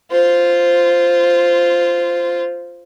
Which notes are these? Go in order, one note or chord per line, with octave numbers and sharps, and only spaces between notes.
F4 C5